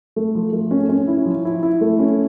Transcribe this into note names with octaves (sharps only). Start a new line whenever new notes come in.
A3
F3
A3
C#4
C#4
E4
F3
E4
E4
A3
C#4